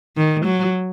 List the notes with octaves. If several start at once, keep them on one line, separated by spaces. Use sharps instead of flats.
D#3
F#3